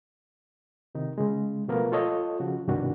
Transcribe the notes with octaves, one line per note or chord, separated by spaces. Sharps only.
C3 D#3 D#4
C#3 G#3
B2 F3 A3 B3 A#4 F5
F4 A4 C#5 D#5
C#3 F3 F#4
C2 G2 B2 D#3 D4 F#4